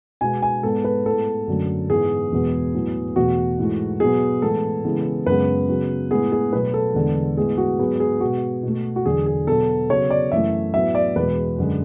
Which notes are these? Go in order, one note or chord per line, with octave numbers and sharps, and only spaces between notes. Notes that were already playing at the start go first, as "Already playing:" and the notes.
B2 G#3 B3 G#5
G#5
G#2 G#3 B3 A4
B4
A2 G#3 B3 A4
F#2 D3 F#3 A3
G#2 E3 G#3 B3 G#4
E2 B2 G#3 B3
A2 F#3 B3
E2 B2 A3 F#4
G#2 E3 A3
B2 F#3 B3 G#4
A2 E3 G#3 B3 A4
C#3 E3 G#3 B3
F#2 C#3 G#3 B3 B4
C#3 F#3 B3
A2 G#3 B3 G#4
G#4
B2 F#3 A3 B4
A4
E2 D3 G#3 B3
A2 G#3 B3 G#4
F#4
G#2 F#3 B3 G#4
G#4
B2 G#3 B3 F#4
B2 A3
F#4
E2 D3 F#3 G#4
G#4
B2 F#3 B3 A4
C#3 F#3 B3 C#5
D5
F#2 E3 A3 E5
A2 F#3 B3 E5
D5
E2 B2 G#3 B4
F#2 D3 G#3